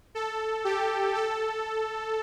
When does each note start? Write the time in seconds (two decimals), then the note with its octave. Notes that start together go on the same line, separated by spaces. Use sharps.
0.15 A4
0.64 G4
1.15 A4